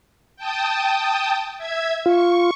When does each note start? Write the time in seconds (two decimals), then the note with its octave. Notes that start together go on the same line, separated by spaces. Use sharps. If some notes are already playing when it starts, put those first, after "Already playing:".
0.36 G5 A5 D#6
1.58 E5 G#6
2.06 F4 C#6